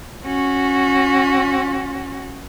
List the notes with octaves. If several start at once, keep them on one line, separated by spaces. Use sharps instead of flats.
C#4 F#4